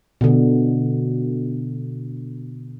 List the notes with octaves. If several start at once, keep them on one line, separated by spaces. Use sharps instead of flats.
B2 D3